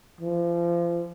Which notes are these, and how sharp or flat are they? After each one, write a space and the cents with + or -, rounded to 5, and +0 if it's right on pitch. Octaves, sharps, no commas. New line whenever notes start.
F3 -30